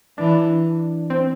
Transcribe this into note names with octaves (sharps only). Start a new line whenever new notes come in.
E3 D4
C4